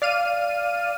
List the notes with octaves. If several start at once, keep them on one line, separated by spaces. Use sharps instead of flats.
D5 F5 F6 D#7